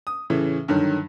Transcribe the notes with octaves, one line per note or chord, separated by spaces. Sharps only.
D#6
A2 C#3 E3
G2 D3 D#3 F#3